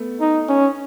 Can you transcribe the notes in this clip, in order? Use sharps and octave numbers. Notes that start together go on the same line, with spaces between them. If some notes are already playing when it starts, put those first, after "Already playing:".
Already playing: A3 B3
D#4
C#4